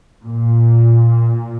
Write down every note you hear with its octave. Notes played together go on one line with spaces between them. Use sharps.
A#2